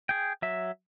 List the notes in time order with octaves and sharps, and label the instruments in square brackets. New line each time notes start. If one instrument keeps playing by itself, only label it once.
[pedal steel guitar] G#4 G5
F#3 E5